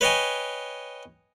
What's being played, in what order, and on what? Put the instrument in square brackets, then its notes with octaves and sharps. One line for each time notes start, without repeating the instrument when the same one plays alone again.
[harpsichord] B4 C#5 D#5 G5 G#5